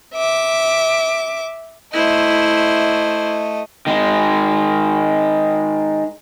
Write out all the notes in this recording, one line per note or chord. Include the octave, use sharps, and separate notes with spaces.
E5 D6
A3 E4 C5 D#5
D#3 G#3